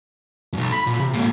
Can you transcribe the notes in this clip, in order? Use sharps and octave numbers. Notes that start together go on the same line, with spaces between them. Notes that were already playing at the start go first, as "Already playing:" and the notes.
B1 F#2
B5
A#2
C3
G#2 A#3